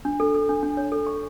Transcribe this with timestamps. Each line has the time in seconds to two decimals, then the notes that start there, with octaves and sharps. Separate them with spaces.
0.05 D4
0.20 A4
0.34 A4
0.49 D4
0.63 D4
0.77 C#5
0.92 A4
1.07 C#6